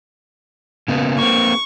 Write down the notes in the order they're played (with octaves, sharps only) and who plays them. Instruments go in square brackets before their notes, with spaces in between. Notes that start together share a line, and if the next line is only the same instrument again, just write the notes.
[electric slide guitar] C#3 A#3 B3
[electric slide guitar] A#3 C4 [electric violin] C#6